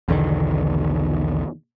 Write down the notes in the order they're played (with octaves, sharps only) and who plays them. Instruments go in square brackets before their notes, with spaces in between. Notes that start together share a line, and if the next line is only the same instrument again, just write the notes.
[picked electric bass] B1 E2 D3 D#3